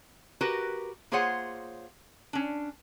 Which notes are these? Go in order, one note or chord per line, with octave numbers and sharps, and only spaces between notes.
F#4 G4 A#4 B4
A#3 F4 G#4 C5 C#5 F#5
C#4 D4